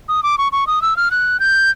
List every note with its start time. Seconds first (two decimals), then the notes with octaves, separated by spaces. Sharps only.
0.09 D#6
0.23 D6
0.38 C#6
0.52 C#6
0.67 D#6
0.82 E6
0.97 F6
1.11 F#6
1.40 G6